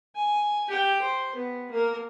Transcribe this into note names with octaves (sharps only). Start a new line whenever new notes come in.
G#5
G4 G5
C5
B3
A#3 A#4